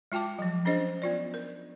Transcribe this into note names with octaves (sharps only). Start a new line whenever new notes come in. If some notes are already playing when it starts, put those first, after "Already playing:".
G#3 F4 G5 A5 D6
F3 F#3
C#4 D4 G#4 C5 D#5
B3 F4 D5
A#4